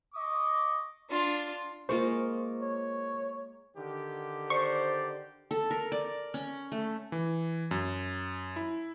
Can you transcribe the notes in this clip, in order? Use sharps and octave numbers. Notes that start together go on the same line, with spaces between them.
D#5 C#6 D6
D4 F4
G#3 A#3 F4 C5 C#6
C#5
D3 D#3 G4
C5 D5 C#6
A4
A#4
D5
C#4
A3
E3
F#2
E4